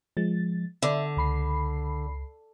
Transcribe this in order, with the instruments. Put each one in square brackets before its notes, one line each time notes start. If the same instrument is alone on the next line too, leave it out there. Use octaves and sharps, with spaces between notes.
[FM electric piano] F3 G#3 A6
[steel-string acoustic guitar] D3 [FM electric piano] D5 E5
[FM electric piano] C#2 B5 C7